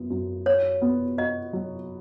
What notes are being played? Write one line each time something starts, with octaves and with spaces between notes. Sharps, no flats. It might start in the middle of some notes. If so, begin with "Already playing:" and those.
Already playing: F#2 B3
F#2
F#4 C#5
B3
F#4 D#5
F#3